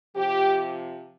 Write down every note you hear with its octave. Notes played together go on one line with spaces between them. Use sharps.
C3 F3 G4